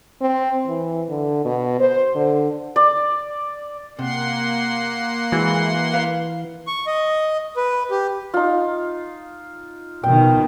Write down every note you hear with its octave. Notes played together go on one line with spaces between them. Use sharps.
C4
E3
D3
B2
C5
D3
D5
C3 A#3 F#5 C6
E3 G#3 F#4
B4 F5
C#6
D#5
B4
G4
D#4 F4
B2 D#3 G5